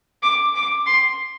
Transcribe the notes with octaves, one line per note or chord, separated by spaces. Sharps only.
D6
D6
C6